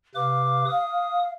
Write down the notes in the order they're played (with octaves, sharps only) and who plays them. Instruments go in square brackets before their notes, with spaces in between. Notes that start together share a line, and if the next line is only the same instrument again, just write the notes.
[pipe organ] C3 B4 D6 [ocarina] F5
[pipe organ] D#6